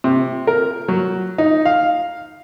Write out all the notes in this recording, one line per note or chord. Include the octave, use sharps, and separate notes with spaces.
C3
A#4
F#3
D#4
F5